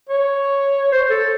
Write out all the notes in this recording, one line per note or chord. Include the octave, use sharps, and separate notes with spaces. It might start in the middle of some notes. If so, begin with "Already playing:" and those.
C#5
C5
A4